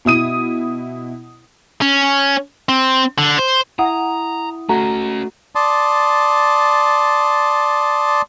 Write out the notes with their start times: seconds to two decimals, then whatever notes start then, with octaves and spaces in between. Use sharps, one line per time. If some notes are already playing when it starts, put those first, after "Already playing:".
0.05 B2 E4 D#6 D#7
1.81 C#4
2.69 C4
3.18 D3
3.38 C5
3.79 E4 F#5 A#5 D#6
4.69 A3 C#4 F#4 D#5 A#5
5.55 D5 A5 C6 D#6